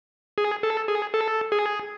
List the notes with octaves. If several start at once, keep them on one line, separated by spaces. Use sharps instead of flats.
G#4
A4
G#4
A4
G#4